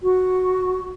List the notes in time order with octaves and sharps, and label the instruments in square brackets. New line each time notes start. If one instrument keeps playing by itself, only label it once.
[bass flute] F#4